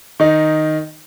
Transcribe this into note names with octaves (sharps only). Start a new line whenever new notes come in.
D#3 D#4